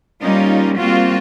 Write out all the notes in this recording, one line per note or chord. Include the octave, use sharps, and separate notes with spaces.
G3 A#3 C#4 D#4 F4
G3 A#3 C4 F4 F#4